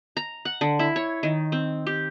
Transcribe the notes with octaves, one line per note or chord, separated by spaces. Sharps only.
A#5
F#5
D3
E4
C#5
D#3
C4
G4